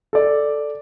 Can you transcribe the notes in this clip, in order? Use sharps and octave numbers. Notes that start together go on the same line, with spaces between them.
A4 D5